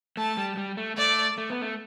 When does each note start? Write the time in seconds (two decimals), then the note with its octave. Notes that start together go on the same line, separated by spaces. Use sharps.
0.17 A3 A5
0.37 G3
0.57 G3
0.77 A3
0.97 A3 D5
1.38 A3
1.50 B3
1.61 A3